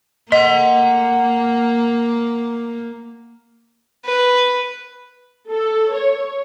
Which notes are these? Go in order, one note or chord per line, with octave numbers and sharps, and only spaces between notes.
A#3 D#5 F#5 C6
B4
A4
C#5